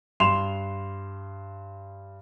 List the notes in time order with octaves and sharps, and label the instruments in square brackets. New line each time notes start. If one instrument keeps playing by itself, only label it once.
[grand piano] G2 C6 E7 F7